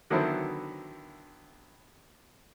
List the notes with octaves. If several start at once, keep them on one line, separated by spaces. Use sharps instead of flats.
D3 D#3 F#3 B3 E4 C5